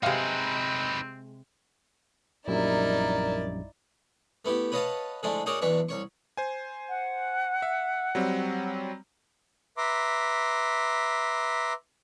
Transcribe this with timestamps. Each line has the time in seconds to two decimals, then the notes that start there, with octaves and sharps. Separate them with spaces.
0.03 C3 G#3 C4 D#4 G4 B4 F5
2.48 A#1 F#2 G3 D#4 E4 A#4 D5
4.45 A3 B3 E4 G4
4.72 B4 C#5 D#5 F5 F#5 A5
5.23 D3 F3 G#3 A3 D4 E4
5.46 D#4 F#4 G#4 A#4 C#5 D5
5.62 B1 E2 E3 D4 E5 C#6
5.89 C2 C#5 C#6
6.37 C5 G#5
6.89 F#5
7.62 E5
8.15 F#3 G3 C4
9.77 B4 E5 A#5 C6 D6